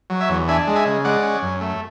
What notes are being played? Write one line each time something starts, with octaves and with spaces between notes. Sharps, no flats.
F#3
C#5 E5
E2
D4 E5 G#5
G#3
E5 G#5
C#3
G#3 D5 F#5
C#4
F#2
A3